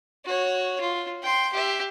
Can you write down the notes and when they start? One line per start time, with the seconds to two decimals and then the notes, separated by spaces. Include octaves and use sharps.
0.25 F#4 C#5
0.81 F4
1.22 G5 C6
1.53 G4 E5